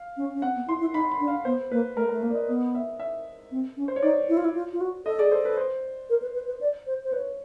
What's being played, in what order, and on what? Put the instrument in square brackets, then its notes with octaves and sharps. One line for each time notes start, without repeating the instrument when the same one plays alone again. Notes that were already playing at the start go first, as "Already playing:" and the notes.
Already playing: [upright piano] F5
[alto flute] C#4
C#4
[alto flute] C4 [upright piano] F#5
[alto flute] B3
[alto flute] E4 [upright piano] C6
[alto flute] E4
[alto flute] D#4 [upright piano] B5
[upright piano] B5
[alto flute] D4
[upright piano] F5
[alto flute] B3 [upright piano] C5
[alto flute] A#3 [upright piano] B4
[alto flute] A3 [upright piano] A#4
[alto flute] A3 [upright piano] A#4
[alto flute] A#3 [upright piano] A#4
[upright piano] D5
D#5
[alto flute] B3 [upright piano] D#5
[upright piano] E5
E5
[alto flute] C4
C#4
[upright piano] C5
C#5
[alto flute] D#4 [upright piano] D5
[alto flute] E4
F4
E4
F4
F4
F#4
[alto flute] A4 [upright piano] D#5
[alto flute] G#4 [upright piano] D5
[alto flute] A4 [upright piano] C5
[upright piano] B4
C5
[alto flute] A#4
B4
B4
B4
D5
C5
C5
[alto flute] B4 [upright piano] C#5